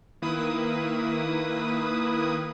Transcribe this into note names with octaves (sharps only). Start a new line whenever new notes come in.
D#3 A#3 E4 B4 D#6